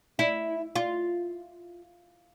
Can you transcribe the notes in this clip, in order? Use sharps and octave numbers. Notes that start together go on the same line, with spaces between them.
E4
F4